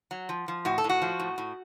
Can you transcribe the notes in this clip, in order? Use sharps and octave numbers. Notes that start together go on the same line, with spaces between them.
F#3
F3
F3
A2 F#4
A4
A2
F#4
F3
A2
A2